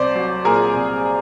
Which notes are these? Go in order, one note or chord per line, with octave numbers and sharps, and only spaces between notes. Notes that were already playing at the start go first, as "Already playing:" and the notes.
Already playing: C2 C5 D5
F#3
A#2 G#4 A#4
C2